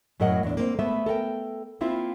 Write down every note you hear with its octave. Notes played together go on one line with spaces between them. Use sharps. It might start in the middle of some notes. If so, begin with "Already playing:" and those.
F#2 A2 F#3 A#4 D#5 F#5
E2 D4
A#3 C4
A3 B3 B4 E5
A4 A#4 F#5 G5
A#3 C4 E4 F4 E5